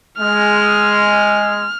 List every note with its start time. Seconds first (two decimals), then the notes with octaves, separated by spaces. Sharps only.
0.18 G#3 F6